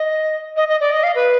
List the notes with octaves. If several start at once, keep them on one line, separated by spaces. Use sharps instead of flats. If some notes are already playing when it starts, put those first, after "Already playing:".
Already playing: D#5
D#5
D#5
D5
D#5
F5
B4